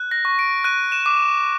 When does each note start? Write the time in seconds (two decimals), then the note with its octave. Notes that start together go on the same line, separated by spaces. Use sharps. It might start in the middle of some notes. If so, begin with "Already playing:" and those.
Already playing: F#6
0.11 A#6
0.25 C#6
0.39 D7
0.64 F#6 D#7
0.92 E7
1.06 D6